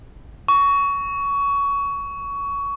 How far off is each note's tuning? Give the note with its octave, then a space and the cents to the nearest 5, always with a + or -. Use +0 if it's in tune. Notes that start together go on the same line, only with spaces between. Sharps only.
C#6 +20